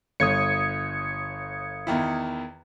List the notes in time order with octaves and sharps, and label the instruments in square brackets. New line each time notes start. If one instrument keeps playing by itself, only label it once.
[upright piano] G1 [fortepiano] C#5 [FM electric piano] D#6 G#6 C#7
[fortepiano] E2 D#3 E4